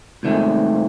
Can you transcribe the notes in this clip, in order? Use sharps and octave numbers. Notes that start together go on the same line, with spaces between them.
C2 G#2 D#3 A3